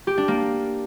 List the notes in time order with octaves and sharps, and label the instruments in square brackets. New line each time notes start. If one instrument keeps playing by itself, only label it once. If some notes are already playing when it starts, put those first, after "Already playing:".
[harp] G4
D4
A#3